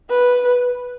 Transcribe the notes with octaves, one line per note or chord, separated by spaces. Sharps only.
B4